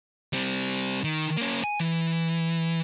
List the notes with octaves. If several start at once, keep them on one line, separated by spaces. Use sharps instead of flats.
G3 C4
D#3
A#3 C#4
G#5
E3